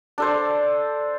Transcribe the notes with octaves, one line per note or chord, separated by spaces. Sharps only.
D4 A4 C5